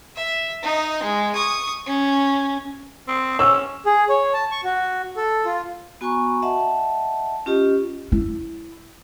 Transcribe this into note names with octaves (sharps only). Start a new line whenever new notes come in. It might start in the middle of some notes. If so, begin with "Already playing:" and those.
E5
D#4 D#5
G#3
C#6 D#6
C#4
C4
C#4 E6
G#4
C#5
A5
C#6
F#4
A4
F4
B3 F#4 G#5 A#5 B5 C#6
D#5 E5 F#5 A5
C#4 F4 G4 D#5
E4